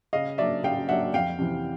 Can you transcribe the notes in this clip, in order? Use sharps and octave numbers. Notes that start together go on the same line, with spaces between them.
C#3 D#5 F5
F#3 A#3 D4 D5 E5
C#3 F5 G5
F#3 A#3 D4 E5 F#5
F2 F5 G5
C3 E3